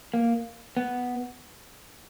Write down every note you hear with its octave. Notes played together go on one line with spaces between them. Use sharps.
A#3
B3